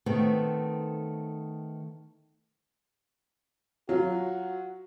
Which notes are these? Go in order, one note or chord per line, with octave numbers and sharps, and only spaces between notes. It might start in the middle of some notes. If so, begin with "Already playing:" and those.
D#3 A3 B3 C4 B4
F#3 F4 F#4